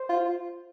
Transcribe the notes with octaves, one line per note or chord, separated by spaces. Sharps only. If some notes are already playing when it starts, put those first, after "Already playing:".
Already playing: C5
F4